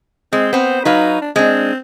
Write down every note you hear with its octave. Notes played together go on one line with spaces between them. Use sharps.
G#3 C4
B3 C4 C5
F#3 D#4 B4 F5
D4
G#3 C4 D4